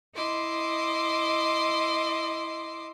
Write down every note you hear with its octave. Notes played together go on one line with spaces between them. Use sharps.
E4 D#5 C6 D6